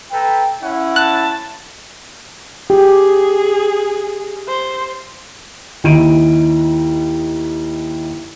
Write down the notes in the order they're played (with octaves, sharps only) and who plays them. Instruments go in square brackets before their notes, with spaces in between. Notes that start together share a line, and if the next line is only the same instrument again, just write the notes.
[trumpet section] A4 B4 A#5 [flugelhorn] G5
[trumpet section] C#4 F#5 [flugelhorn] E4
[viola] A5 [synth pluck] F#6
[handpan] G4 [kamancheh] G#4
[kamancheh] C5
[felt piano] D#2 D#4 E4 D7 D#7